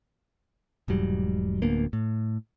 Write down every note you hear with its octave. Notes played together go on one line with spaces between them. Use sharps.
E1 G#2 F#3 G3
D1 D2 A#3 B3
A2